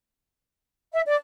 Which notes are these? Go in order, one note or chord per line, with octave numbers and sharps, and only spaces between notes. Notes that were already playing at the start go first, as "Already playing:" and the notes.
E5
D5